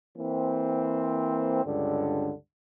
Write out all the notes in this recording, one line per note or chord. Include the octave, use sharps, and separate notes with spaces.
E3 A#3 C4
C#2 G2 D3